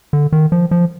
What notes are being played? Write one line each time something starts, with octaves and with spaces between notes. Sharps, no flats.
D3
D#3
F3
F3